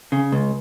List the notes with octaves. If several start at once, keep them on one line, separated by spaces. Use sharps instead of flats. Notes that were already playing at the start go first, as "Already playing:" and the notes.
C#3
C#2